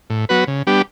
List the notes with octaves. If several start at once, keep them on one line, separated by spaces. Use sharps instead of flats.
A2
F#3 B3 F#4 B4
C#3
G3 B3 D4 G4